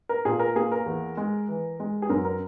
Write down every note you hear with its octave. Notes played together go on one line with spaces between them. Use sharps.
A#4
A#2 G#4
A#4
A#3 G#4
A#4
E2
G#3
E3
G#3
G#4
F#2 A#4
A#4